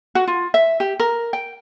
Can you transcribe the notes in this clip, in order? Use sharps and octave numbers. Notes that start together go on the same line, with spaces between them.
F#4
F4
E5
G4
A#4
G5